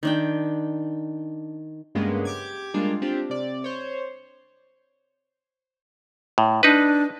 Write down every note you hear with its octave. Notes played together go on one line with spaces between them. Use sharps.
D#3 D4 G5
G2 C#3 G#3 A#3 B3 C#4
G4 D6 G#6
G3 G#3 A#3 D4 F4
C4 D4 F4 G4
C3 D5
C5 C#5
A2
D4 D#4 B4